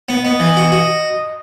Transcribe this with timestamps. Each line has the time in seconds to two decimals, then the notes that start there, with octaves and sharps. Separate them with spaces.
0.09 B3
0.24 B3 D#5
0.40 E3
0.57 F#4
0.72 F#4